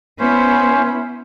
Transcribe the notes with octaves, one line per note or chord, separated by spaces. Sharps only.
B3 C#4 E4 C5